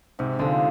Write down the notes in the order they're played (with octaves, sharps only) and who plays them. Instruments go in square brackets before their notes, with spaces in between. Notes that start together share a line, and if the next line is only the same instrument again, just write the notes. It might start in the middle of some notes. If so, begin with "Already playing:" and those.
[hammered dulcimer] G#2 [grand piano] C3
[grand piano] D3 [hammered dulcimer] F3 G#3